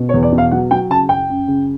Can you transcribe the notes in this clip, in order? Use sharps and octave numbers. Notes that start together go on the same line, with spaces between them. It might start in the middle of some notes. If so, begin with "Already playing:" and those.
Already playing: B2
C#5
E2
D5
B2
F5
F#3 F#5
F#3 G5
C#3 A5
F#2 G5
F#2
C#3